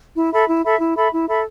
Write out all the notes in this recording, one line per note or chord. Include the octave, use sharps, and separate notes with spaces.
E4
A4 E5 B5
E4
A4 E5 B5
E4
A4 E5 B5
E4
A4 E5 B5